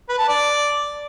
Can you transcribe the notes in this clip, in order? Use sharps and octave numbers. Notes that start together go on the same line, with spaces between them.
B4
A5
D5